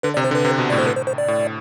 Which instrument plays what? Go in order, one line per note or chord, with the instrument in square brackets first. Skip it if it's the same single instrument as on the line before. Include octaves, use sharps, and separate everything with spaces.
[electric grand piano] D3 [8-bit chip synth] B4
[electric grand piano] C3 [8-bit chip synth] D5
[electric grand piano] C3 [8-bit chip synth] C5
[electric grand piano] D3
[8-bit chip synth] B4
[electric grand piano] C3
B2
[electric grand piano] A2 [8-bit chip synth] D5
[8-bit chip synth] C5
B4
C5
C5
D5
[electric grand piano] A2